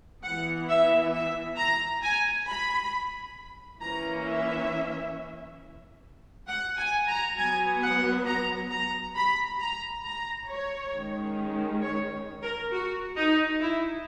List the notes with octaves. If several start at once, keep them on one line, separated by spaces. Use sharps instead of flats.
E3 B3 F#5
E5
E5
A#5
G#5
B5
E3 A#3 C#4 A#5
E5
F#5
G#5
A#5
F#3 B3 G#5
F#5
A#5
A#5
B5
A#5
A#5
C#5
D#3 G#3 C#4
C#5
A#4
F#4
D#4
E4